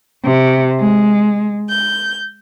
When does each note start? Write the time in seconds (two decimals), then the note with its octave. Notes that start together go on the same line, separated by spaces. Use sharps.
0.24 C3
0.80 G#3
1.70 G6